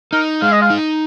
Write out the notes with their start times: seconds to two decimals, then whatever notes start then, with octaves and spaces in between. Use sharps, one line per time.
0.12 D#4 A#4
0.42 G#3 F5
0.52 D#5
0.62 F5
0.70 D#4